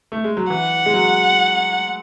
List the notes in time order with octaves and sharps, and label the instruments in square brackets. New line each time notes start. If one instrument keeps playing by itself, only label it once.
[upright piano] A3
G#3
F#3
[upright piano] E3 [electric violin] F#5
[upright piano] G#3
F#3